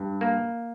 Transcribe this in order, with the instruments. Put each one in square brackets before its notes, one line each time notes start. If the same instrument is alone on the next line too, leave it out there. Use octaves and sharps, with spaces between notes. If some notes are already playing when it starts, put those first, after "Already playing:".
Already playing: [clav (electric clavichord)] G2
A#3